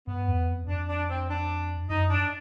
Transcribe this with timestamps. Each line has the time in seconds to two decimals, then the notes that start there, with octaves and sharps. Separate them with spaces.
0.07 G2 B3
0.28 E2
0.48 F2
0.67 F2 D4
0.88 D4
1.09 C4
1.29 D4
1.89 F#2 D#4
2.10 D4